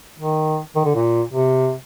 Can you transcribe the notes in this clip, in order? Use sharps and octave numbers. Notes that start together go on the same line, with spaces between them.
D#3
D#3
D3
A#2
C3